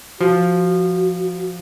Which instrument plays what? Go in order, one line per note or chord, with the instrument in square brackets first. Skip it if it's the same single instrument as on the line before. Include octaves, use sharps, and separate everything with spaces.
[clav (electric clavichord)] F3 [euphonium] F#4